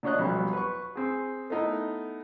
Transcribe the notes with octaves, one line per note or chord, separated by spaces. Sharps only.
A#2 D4 C#5 D#5 F#6
B1 F2 B2 F#3 G3
B4 C#6
C4 G#4
A3 B3 D#4 E4 A#4